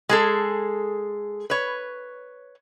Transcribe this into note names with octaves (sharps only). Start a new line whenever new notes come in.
G#3 G#4 A4
B4 C#5